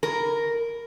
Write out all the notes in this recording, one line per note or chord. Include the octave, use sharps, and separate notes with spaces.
A#4